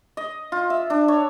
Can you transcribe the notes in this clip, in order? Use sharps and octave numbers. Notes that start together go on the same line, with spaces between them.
D#5
F4
E5
D4
C#5